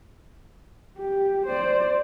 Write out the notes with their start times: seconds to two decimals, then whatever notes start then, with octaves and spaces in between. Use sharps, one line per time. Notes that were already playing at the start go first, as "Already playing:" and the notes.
0.98 G4
1.46 C5 D5